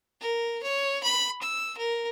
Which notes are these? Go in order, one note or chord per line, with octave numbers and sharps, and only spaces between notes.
A#4
C#5
B5
E6
A#4